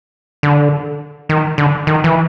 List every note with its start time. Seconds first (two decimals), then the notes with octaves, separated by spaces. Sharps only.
0.43 D3
1.29 D#3
1.58 D3
1.87 D#3
2.04 E3